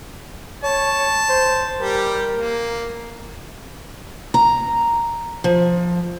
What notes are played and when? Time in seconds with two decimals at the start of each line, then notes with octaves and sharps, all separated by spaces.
0.63 C#5 A5
1.29 C5
1.81 G3 G4 A#4
2.35 A#3
4.34 A#5
5.44 F3